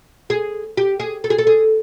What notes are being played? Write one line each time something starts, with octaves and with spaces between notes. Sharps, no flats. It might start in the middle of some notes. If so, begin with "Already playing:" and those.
G#4
G4
G#4
A4
G#4
A4
G#4